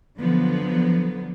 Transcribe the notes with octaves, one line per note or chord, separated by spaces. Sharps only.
D3 F3 F#3 B3